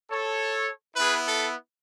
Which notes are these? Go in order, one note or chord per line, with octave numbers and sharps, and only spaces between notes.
A4 C#5
B3 E4 G#4 B4
A4